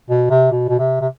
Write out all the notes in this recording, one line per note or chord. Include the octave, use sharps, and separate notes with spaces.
B2
C3
B2
B2
C3
C3